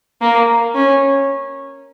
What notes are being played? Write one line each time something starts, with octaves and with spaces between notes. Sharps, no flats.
A#3
C#4